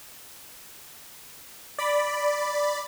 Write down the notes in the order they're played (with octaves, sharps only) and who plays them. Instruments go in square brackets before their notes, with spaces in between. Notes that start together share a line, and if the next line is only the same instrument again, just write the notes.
[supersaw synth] D5 B5